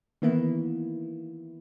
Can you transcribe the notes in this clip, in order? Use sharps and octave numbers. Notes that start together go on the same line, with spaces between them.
D#3 E3 A#3 B3 E4